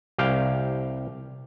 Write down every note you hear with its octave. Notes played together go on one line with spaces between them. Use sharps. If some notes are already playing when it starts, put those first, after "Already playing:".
C2 G4 F5 G5